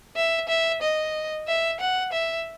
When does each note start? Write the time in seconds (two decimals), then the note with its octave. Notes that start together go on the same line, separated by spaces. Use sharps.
0.16 E5
0.49 E5
0.82 D#5
1.47 E5
1.80 F#5
2.12 E5